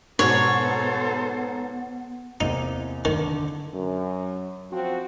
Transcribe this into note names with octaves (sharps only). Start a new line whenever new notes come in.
G#2 B2 B3 A4 C5 C#5
E2 C3 A#3 D#4
D3 D#3
F#2
F3 C4 F#4